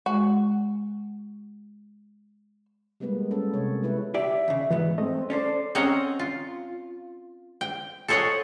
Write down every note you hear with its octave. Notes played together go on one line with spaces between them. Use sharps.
G#3 F#4
G3 G#3 A#3 B3 B4
G#3 B3 C#4 A4
C3 C#5
G#3 B3 E4 B4
E4 G4 D5 E5
D#2 C#3
E2 G#2 E3 B3
A3 C4 D#5
C#4 A4 C5 D5
C4 C#4 D#5 F#5 A#5
F4
G5
A4 C5 C#5 D#5 F#5 G#5